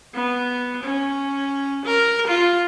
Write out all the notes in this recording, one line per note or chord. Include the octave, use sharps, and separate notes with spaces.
B3
C#4
A#4
F4